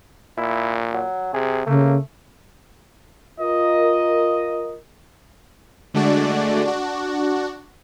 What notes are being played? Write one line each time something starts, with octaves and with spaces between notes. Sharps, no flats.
A#2 E4
F#3
C3 G#4
C#3 A3 A#3
F4 A#4 D#5
D3 G#3 A3 D4 F#4 D5
D4 F#4